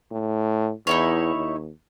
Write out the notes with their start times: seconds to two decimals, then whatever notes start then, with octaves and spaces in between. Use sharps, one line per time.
0.11 A2
0.87 E2 D#4 E4 C#5
1.35 D#2